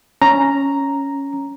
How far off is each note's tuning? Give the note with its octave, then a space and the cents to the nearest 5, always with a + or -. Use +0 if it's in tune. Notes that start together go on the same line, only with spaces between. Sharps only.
C#4 +0 A#5 +0